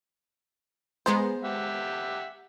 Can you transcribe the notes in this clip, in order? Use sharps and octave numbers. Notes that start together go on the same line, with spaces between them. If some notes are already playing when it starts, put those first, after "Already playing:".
G#3 B3 C5 A#5
G4 E5 F#5